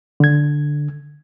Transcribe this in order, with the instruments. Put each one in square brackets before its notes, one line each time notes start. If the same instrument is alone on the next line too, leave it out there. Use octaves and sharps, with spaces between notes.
[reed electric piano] D3 G#6